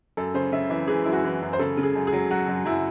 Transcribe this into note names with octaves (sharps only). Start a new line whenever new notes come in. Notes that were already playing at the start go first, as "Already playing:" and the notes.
F#2 A4
C#3 C5
C#3 E5
E3 E5
E3 G#4
F#2 E4
F#4
E3
F#2
C5
C#3 A4
C#3
G#4
F#2
G#4
F#3
F#3 F#4
F#2
F#2 E4